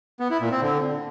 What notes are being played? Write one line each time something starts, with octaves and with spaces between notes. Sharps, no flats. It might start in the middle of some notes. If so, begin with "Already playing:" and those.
B3
E4
A#2
C4
D3